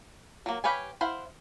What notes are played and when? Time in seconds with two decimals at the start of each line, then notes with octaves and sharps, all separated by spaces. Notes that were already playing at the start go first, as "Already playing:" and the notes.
0.46 F#3 A#3
0.64 G4 B4 C#5 F5 G#5
1.01 E4 C5 F5 F#5